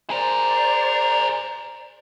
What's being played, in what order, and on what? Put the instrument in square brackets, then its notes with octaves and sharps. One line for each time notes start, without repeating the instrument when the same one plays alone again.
[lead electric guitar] G#4 A#4 [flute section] C5 D5